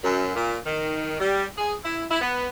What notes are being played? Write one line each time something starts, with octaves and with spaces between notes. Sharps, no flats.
F#2
A#2
D#3
G3
G#4
E4
E4
B3